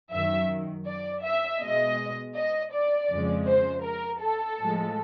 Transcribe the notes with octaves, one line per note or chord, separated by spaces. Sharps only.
F#2 D#3 F#3 E5
D5
E5
B2 G#3 D#5
D#5
D5
F2 C#3 F3 G#3
C5
A#4
A4
A2 F3 G#3